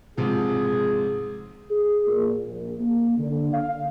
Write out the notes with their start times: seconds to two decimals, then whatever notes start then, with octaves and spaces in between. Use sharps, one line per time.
0.17 G#2 C3 F3 G#4
1.70 G#4
2.07 A#2
2.46 A#1
2.80 A#3
3.18 D3
3.53 F5